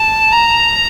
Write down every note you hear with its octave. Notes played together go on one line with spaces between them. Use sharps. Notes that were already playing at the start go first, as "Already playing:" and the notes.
Already playing: A5
A#5